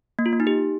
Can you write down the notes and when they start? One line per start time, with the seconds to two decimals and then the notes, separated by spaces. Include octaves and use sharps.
0.19 A#3
0.26 F4
0.33 A#3
0.40 D#4
0.47 G4